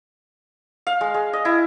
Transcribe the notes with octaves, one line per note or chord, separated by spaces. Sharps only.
F5
G#3
G#3
D#5
E4